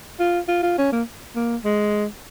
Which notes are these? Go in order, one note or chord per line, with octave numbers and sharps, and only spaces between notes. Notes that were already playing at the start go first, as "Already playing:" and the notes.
F4
F4
F4
C#4
A#3
A#3
G#3